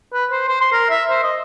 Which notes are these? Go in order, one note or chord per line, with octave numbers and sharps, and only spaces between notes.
B4
C5
C5
C6
A#4
E5
C5
D#5